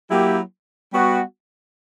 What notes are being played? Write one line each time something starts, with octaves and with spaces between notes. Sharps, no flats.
F#3 A#3 E4 G4
G3 B3 F#4